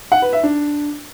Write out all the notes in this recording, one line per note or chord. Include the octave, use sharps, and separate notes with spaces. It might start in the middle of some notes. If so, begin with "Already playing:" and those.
F#5
B4
E5
D4